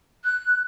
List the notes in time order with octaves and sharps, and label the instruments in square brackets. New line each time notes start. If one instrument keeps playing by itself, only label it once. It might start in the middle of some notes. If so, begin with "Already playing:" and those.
[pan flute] F#6